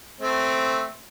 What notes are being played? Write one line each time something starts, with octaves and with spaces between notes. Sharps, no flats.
A3 C4